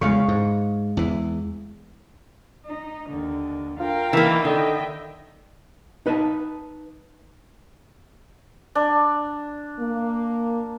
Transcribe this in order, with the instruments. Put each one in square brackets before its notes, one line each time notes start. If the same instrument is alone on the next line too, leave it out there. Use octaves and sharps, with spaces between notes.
[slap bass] E2 C#3 [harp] G#3 F5 C#6
[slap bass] G#2
E2 E3
[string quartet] D#4
D#2 D3
[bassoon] F4 [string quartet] A#4 F5 G5
[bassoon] D#3 [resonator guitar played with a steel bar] E3 A#3
[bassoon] D3 [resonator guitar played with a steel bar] D#3 [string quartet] D#5 E5 G5
[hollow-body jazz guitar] D#4 B4 D#5 A5
[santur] D4
[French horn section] A#3